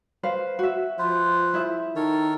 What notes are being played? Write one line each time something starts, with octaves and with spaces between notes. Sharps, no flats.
B4 C5 F5
F#4 E5
F3 F4 B4 C5
E4 G#4 E5
D#3 A4 A#4 C#5